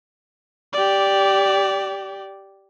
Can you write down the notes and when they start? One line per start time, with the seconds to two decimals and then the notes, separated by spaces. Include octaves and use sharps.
0.73 G4 D5